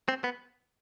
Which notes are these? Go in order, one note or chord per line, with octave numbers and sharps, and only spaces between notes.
C4
B3